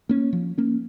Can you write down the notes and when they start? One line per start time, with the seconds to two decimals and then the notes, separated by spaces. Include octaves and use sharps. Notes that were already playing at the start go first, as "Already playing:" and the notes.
0.09 A#3 C#4
0.33 F3
0.58 A#3 C#4